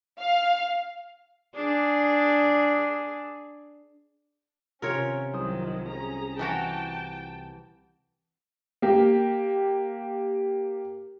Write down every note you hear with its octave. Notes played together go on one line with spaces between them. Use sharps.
F5
D4 G#4
C3 C#4 F4 A#4 C#5 G#6
C2 D#3 F3 F#3 C5 D#6
C#4 G#4 A#5
E3 F#4 G5 A5 A#5 A6
A#3 G4